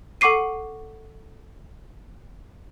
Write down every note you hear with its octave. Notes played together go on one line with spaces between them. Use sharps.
A4 F#5 C#6 D6 C7 D#7